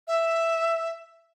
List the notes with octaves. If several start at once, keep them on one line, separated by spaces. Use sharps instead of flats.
E5